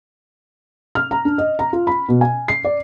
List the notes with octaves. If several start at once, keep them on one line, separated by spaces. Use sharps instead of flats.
F6
A#5
D4
D#5
A#5
F4
B5
B2
G#5
C7
D5